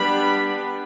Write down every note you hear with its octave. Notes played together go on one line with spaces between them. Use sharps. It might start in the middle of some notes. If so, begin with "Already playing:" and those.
Already playing: G3 B3 D4 B5